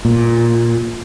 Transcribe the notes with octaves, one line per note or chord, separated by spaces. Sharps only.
A#2